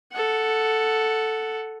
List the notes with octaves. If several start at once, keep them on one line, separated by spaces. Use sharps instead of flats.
A4 F#5